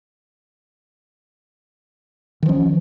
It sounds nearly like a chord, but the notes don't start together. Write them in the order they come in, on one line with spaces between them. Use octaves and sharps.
D#3 F3 C#4